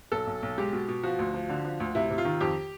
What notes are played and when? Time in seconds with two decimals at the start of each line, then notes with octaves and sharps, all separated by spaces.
0.12 B1 A4
0.27 B1
0.43 B1
0.58 G#3 G4
0.73 B2
0.88 B2
1.03 F3 F#4
1.19 D2
1.34 F3
1.49 D3
1.65 F3
1.80 D2
1.95 C3 E4
2.10 C3
2.18 F4
2.25 D#3
2.41 F2 G4